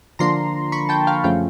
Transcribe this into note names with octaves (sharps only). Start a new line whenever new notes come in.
D3 F3 A#3 D4 A#5 C6
B5 C#6
G5 A5
F5 G5
F#2 C#3 F3 A3 F5 G5